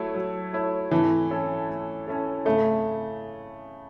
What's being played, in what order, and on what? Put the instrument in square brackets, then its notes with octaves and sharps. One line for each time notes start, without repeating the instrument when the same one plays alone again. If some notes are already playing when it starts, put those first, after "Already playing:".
Already playing: [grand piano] F#3 A3 E4 C#5
F#3
A3 E4 C#5
[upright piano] E3 [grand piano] A3
[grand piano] C#4 E4 A4 C#5
A3
C#4 E4 A4 C#5
[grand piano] C#3 [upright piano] A3